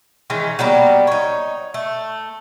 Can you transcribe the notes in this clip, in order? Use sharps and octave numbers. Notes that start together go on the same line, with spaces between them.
D#3 E3 G#3 C#4
F#3 G3 A#3 B3
D#4 C#5
A3